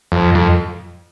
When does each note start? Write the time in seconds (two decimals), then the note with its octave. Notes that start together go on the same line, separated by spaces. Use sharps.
0.12 F2
0.35 F2